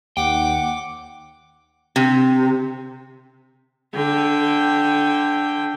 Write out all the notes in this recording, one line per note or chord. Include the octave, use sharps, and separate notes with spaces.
D#2 F#5 G5 D6
C3
D3 G5